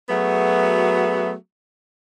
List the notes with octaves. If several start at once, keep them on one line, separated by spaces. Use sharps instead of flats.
F#3 A3 B3 F#4 G#4